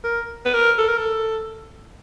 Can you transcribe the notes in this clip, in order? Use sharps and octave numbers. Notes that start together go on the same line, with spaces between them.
A#4
B4
A#4
A4
A#4
A4